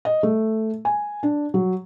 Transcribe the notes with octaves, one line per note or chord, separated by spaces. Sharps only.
D#5
A3
G#5
D4
F#3